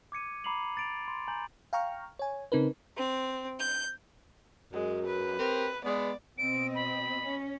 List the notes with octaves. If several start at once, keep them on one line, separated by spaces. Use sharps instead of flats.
D6 G#6 C#7 D#7
A#5 B5 D6 C7 F7 F#7
A6 D7 F7
C6
G#5 A#5 G6 F#7
F5 G5 A#5 C#6 F6
C#5 G#5
C#3 C4 D#4 A#4 B4
C4
G6
F#2 G#3
B4
C4 G4 A#4
G#3 B3 D5
B2 C4 D#5 D7
B5
C#4